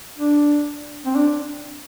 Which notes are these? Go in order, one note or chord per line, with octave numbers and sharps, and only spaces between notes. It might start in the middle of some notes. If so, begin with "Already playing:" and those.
D4
C4
D4